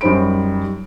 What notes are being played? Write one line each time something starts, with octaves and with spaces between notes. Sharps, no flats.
F#2 G3 D#4 C5 B5 D7